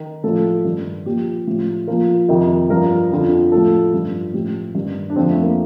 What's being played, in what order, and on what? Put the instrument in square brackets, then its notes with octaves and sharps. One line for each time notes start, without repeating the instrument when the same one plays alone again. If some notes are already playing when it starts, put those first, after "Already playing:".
Already playing: [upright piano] D#3
A2 F3 A4
G2 D#3
A#2 F3 G4
A2 F3
A#2 F3 A#4
F2 C3 D#3
G2 F3 A#4
F2 D3 F3
A2 F3 A4
G2 F3
A2 F3 G4
G2 D#3
D4
F2 D3 F3 C4
A3
A#3